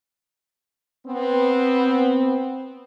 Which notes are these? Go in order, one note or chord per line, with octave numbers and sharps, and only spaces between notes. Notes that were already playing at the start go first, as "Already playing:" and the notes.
B3 C4